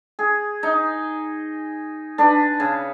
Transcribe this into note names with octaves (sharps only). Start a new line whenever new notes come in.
G#4
D#4
D4 B4
C#3